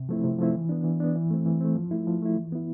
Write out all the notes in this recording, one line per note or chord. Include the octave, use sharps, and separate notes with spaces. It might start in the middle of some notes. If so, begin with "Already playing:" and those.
Already playing: C3
F3 A3 C4 E4
C3
F3 A3 C4 E4
E3
B3 D4
E3
B3 D4
E3
A3 C4
E3
A3 C4
F3
A3 E4
F3
A3 E4
E3
B3 E4